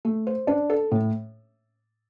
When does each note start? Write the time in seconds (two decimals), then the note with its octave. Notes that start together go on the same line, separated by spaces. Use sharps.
0.05 A3
0.27 C5
0.47 D4
0.70 A4
0.92 A2